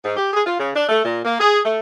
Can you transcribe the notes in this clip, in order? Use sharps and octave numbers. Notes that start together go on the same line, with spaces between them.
G#2
G4
G#4
F4
C#3
D4
A3
A#2
A#3
G#4
A3